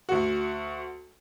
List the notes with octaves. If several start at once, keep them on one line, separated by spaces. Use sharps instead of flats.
D2 F#4